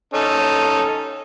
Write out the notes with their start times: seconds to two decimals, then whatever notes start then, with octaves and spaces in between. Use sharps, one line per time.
0.14 C#4 D#4 A4